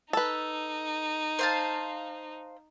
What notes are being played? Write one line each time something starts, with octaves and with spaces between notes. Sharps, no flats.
D#4 A4 B4
C5 F5 A5